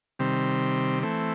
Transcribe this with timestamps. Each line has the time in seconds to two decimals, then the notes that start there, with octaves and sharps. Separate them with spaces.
0.19 C3 D#3 G3 C4
1.03 E3 A3 C4